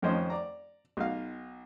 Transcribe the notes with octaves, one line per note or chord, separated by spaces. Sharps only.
F2 D#3 F3 C#4 C5 D#5
D5 A#5
B1 D#4 F5